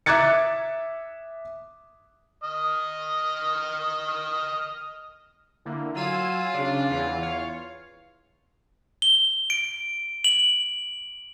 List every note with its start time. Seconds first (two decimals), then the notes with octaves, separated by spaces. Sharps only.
0.06 E5 D6 F#6 G#6 A6 C#7
2.44 D#5 D#6 F6
5.66 D3 A#3 E4
5.96 F#3 F4 G#5 E6 D#7
6.54 C#3 D4
6.91 E2 E3
7.22 C#5 F5
9.02 G7
9.50 D7
10.24 F#7